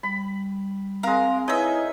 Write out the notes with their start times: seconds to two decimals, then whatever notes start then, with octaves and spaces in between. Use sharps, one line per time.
0.03 G3 B5
1.03 G#3 C4 A#4 F5 A#5
1.48 D#4 E4 B4 C#5 D#5 E5 G#5